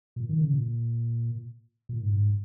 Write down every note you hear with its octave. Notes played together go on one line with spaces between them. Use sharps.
A#2
D#3
C#3
A#2
A#2
G#2
G#2